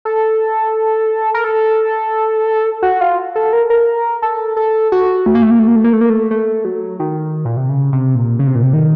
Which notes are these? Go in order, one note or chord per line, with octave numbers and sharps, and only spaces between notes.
A4
A#4
A4
F#4
F4
A4
A#4
A#4
A4
A4
F#4
A3
A#3
A3
A#3
A3
A#3
A3
A#3
A3
A#3
A3
A3
F#3
D#3
A#2
C3
C#3
C3
A#2
C#3
C3
A#2
C3
D#3